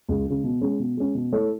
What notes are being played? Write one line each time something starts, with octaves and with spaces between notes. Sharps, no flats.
C#2
C#3 G#3
B2
G#3 C#4
B2
G#3 C#4
B2
A3 E4 A4 C#5